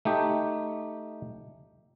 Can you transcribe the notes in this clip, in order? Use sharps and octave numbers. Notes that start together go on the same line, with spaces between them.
A3 D#4 G4